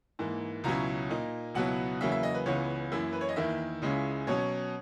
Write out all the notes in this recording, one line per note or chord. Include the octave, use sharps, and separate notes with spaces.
G#2 E3 A#3
C#2 B2 F#3 C#4 E4 A#5
A#2 A#3 D#4
C#2 B2 F#3 B3 E4 F#5
E2 C#3 F#3 A#3 E4 E5
E5
D#5
B4
C#2 C#3 E3 B3 C#5
F#2 E3 A#3 E4
B4
C#5
D#5
E2 D#3 A#3 E4 E5
C#2 C#3 G#3 C#4 E4
B2 F#3 C#4 C#5